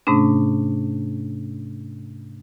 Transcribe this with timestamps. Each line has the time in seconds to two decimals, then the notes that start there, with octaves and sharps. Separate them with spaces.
0.07 G#2 C3 A3 C#4 D4